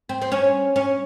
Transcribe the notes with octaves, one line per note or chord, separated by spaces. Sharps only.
C4
C4
C#4
C#4